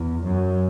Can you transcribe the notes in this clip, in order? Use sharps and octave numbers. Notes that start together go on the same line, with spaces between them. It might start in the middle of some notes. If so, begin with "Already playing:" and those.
Already playing: E2
F#2